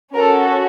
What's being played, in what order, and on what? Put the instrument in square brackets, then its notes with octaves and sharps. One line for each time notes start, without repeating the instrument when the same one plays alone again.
[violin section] C#4 F#4 A4 A#4